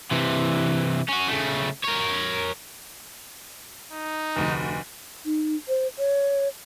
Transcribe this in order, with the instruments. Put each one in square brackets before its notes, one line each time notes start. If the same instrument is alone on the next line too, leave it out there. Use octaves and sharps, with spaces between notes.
[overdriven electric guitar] C3 E3
C#4 F#4
C#3 A3
A#4 C#5
[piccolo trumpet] D#4
[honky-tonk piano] F1 D2
[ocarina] D#4
C5
C#5